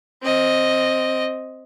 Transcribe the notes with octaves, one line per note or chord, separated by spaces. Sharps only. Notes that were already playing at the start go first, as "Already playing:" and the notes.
C4 D#5